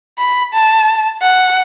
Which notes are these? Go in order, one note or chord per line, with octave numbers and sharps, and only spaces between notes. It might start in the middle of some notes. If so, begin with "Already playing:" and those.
B5
A5
F#5